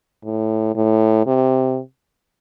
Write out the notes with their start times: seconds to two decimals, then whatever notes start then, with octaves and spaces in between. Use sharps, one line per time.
0.25 A2
0.76 A2
1.26 C3